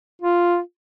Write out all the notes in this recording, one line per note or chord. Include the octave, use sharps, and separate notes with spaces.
F4